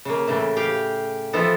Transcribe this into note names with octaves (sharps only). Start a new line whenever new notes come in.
C#3 A#3
A2 C#3 E3
G4 F5 G5
E3 F3 B3 A4